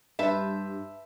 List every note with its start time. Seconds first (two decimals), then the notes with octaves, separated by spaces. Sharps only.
0.19 G2 B4 C5 E5 A5